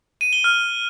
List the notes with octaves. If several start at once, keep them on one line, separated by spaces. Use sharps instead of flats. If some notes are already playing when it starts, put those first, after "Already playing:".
D#7
G7
F6